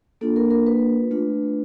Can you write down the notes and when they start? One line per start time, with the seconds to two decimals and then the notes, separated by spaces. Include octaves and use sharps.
0.21 A#3 D4 F4 A4
0.36 A#4
0.50 A#4
0.67 B4
1.11 A3 D4 F4